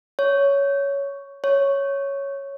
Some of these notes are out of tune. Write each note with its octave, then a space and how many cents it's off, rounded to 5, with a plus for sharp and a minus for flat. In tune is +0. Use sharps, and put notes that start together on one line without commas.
C#5 +10
C#5 +0